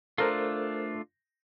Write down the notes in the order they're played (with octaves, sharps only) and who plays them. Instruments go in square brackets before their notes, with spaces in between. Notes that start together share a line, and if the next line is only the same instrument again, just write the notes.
[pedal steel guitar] A3 D4 F4 [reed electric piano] A4 A#4 C5